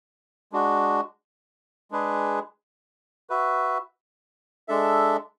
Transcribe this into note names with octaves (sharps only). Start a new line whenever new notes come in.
G#3 D4 F#4
G#3 D4 G#4 B4
F#4 B4 E5
G#3 D4 A4 E5